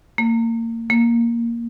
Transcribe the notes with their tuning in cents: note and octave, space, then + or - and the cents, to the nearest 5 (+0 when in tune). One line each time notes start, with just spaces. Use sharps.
A#3 -30
A#3 +0